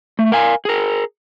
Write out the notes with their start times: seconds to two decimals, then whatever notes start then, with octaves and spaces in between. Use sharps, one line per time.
0.19 A3
0.32 A#4 F5 G#5
0.65 G#4 A#4